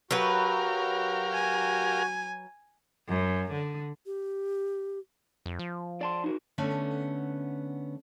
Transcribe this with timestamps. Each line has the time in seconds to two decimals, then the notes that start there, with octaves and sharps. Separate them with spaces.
0.11 F#3 F#4 G4 A#4 B4 F5
1.33 G#5
3.08 F#2
3.52 D3
4.06 G4
5.46 F2
5.59 F3
6.01 D5 A5 C6
6.24 D#4 F#4 A#4
6.58 D3 A3 B3 C#4